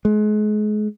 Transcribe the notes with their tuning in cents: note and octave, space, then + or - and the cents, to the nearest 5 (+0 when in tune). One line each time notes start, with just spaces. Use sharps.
G#3 +35